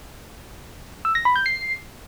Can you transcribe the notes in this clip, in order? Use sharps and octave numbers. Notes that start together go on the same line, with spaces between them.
E6
A#6
B5
G6
C7